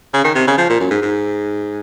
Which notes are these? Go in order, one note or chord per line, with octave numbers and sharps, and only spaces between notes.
C#3
D#3
C3
C#3
F3
A#2
F#2
G#2
G#2